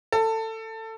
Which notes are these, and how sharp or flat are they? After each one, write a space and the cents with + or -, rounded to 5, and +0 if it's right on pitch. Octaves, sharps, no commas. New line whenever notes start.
A4 +20